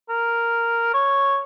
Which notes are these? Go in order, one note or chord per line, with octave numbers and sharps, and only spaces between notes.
A#4
C#5